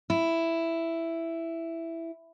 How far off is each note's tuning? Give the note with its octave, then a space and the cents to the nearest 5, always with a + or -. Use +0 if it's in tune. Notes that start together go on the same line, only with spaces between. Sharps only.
E4 +5